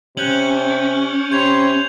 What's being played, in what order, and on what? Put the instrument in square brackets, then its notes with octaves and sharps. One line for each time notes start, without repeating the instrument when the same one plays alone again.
[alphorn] C3 [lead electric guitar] C#4 [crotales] F#6 G6 F#7
[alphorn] C3 [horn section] C#5 B5 C6 [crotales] G6 G#6 F7